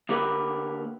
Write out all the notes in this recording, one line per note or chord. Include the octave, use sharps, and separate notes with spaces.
D3 A#3 G4 A#4 B4 B5